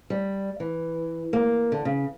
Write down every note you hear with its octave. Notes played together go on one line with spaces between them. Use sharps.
G3
E3
A#3
D3
C#3